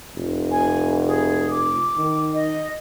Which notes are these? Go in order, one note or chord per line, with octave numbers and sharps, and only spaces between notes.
F1
G#5
G#4
D6
D#3
D#5